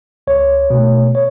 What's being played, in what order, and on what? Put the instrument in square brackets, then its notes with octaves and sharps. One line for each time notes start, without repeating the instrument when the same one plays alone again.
[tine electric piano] C#2 C#5
B2 A3
C#5